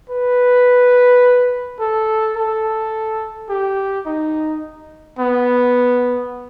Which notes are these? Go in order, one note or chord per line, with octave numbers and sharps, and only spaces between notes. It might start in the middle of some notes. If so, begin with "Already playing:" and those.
B4
A4
A4
G4
D#4
B3